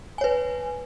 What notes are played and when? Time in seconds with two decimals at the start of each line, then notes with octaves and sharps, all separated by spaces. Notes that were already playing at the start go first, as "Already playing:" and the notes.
0.18 G#5
0.21 C#5
0.24 B4